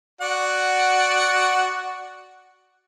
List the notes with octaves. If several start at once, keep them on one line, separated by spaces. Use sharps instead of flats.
F#4 D5 F#5